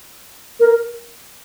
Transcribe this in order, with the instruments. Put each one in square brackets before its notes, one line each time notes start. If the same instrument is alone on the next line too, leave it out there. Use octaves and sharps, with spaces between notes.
[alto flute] A#4